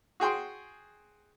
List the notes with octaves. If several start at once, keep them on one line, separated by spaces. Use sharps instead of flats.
F#4 G#4 G5 C6